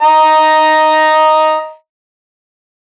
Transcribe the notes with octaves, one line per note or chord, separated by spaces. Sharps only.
D#5 A#5